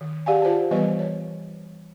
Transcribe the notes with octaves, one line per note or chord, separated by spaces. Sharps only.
D#3
G4 G#4 D5 F5 F#5 G#5
F4 C5 D5 A5
E3 G3 B3 B4 C5 D#5
C#5